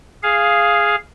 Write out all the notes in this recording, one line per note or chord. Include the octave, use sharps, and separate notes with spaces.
G#4 F5